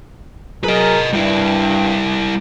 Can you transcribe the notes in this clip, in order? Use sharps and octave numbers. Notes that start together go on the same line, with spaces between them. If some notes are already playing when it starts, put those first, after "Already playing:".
F#3 G#4 A#4 B4 D#5
G2 G3 E4